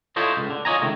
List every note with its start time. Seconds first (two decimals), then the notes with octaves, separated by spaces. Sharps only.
0.16 E4 F4 A4 C5 C#5 D#5
0.37 C#2
0.50 D3
0.65 F4 C#5 D#5 G#5 A#5
0.82 C#2 D#3 A3